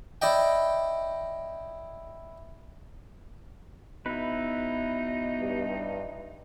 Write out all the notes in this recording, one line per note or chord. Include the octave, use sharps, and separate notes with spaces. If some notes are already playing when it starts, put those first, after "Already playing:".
E4 D5 D#5 G5
B2 D#4 E4 B4
G2